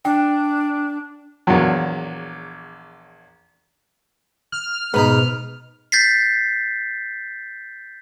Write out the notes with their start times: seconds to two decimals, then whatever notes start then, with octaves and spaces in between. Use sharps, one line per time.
0.05 D4 G5
1.47 A#1 E2 F#3
4.52 F6
4.94 G#2 B2 D#4 B4 A#5
5.92 G6 A6 B6 C7